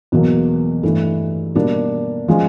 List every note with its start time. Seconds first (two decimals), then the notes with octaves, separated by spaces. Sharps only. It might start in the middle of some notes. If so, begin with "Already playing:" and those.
0.12 E2 B2 F#3 A#3
0.83 G2 E3 A3
1.55 B2 G3 A#3 D4
2.28 F3 G#3 C#4